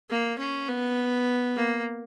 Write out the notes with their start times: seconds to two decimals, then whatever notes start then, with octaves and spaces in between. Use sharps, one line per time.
0.10 A#3
0.39 C#4
0.69 B3
1.56 A#3